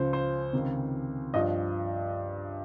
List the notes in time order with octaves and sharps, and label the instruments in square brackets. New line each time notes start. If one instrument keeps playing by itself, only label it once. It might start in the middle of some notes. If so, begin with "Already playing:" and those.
Already playing: [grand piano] C#2 C#3 F3 C5
C5
C#2 C3 D#3
G2 F3 D#5